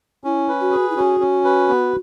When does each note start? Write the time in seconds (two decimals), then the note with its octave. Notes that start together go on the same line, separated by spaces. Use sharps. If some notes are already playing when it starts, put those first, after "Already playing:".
0.24 C#4 E4
0.49 B4
0.60 F#4
0.72 G#4
0.90 E4
0.96 C#4 F#4
1.20 C#4
1.45 B4
1.69 B3